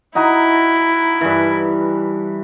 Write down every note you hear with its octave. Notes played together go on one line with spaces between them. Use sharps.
D#4 E4 F#4 A#5
G2 E3